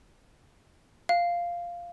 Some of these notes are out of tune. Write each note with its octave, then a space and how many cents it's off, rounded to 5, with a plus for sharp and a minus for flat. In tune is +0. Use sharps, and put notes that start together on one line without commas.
F5 -5